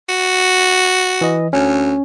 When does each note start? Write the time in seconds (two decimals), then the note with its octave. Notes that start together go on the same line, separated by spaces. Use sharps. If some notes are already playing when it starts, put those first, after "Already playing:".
0.09 F#4
1.21 E3 D#5
1.53 D2 C#4